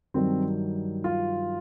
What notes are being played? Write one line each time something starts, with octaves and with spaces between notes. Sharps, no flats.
G2 D#3 F#3 C4
F4